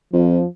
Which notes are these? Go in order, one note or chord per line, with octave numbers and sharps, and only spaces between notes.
F2 F3